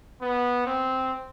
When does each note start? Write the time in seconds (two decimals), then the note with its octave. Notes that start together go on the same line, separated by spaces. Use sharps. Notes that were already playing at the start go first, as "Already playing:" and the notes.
0.22 B3
0.66 C4